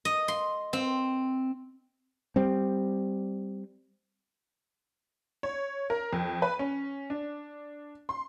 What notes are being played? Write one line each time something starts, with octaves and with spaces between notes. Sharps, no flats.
D#5
C6
C4
G3 C4
C#5
A#4
F2
B4
C#4
D4
C6